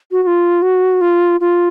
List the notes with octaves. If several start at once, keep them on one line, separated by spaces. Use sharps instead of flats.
F#4
F#4
F4
F#4
F4
F4